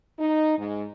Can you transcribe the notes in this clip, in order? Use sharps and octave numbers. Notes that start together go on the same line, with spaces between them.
D#4
G#2